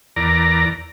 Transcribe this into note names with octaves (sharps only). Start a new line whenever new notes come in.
E2 A#4 D5 A#5